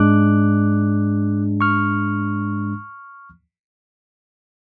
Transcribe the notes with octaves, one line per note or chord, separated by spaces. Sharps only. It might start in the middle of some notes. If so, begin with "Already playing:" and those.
Already playing: G#2 G#3 D4 D6 F#6
C#6 F6